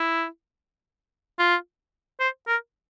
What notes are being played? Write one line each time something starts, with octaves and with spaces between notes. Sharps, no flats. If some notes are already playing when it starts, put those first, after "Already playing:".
Already playing: E4
F4
C5
A#4